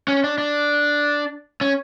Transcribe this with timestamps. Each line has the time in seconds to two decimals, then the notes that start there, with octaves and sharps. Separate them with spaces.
0.08 C#4
0.24 D4
0.38 D4
1.61 C#4